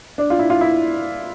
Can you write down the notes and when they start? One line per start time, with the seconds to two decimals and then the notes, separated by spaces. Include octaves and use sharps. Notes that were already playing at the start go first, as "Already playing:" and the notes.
0.18 D4
0.30 F4
0.39 E4
0.50 F4
0.61 E4